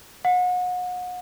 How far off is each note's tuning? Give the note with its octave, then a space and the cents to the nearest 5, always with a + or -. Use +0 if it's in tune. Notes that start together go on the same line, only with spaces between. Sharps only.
F#5 -35